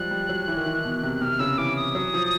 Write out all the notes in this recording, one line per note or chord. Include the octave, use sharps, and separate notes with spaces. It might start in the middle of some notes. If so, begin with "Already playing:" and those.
Already playing: F3 G3 G#3 F#6
G3
F#3
E3
D#3
E3
B2
C3
C3 F6
C#3 E6
E3 D6
D#6
F#3
F3